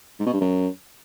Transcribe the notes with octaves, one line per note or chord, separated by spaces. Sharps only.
G#2
B2
G2
F#2